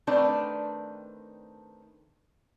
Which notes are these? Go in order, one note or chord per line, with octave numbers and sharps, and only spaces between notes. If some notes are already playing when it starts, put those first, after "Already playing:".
D#3 A3 C4 D4 B4 D5